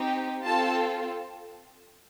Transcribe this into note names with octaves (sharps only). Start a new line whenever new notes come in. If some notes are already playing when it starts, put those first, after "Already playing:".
Already playing: C4 D#4 G4
C4 F4 A4 A5